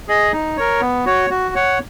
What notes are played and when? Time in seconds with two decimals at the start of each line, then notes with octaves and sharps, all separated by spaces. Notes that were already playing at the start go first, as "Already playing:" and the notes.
0.08 G#4 D#5
0.32 D#4
0.57 A#4 C#5
0.81 B3
1.06 F#4 C#5
1.30 F#4
1.55 C#5 F#5